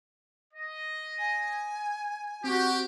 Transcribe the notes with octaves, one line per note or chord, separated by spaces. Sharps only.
D#5
G#5
C4 F#4 G4